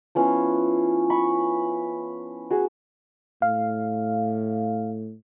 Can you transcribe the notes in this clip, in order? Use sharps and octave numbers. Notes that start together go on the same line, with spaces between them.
F3 B3 C#4 E4
B5 C#6
F#4 G#4
A2 F5